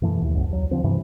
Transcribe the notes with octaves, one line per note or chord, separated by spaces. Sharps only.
F#2 B2 E3 A3
D#2
C2 F#2
D#2 F#3
D3 F3 C4
G2 C3 E3